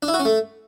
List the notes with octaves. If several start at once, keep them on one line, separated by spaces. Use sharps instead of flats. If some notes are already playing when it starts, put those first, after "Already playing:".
D4
E4
F#4
C#4
A3